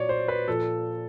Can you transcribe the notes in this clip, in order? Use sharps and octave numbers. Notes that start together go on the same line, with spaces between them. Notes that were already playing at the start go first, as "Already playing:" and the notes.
Already playing: A#2 F#3 C#5 D5
C5
B4
A#2 F3 A4